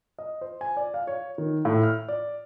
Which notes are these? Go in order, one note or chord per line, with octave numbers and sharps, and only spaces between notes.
D#5
C5
G#5
D5
F5
C#5
D#3
A2
F6
D5